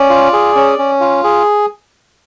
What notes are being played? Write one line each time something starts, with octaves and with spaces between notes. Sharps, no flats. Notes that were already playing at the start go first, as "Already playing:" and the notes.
Already playing: C#4 D5
F4
G#4
C#4
C#4
F4
G#4